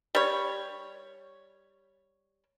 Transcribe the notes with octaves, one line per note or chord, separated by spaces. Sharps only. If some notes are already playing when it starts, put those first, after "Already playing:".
G3 C#5